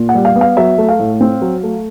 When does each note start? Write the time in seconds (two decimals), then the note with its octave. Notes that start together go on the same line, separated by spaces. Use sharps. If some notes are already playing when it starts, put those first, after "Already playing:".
Already playing: A#2
0.09 F#5
0.15 G3
0.25 F5
0.36 B3
0.41 F5
0.57 F#3 E5
0.78 A3
0.89 F5
0.99 A2
1.21 C4
1.42 F#3
1.63 A3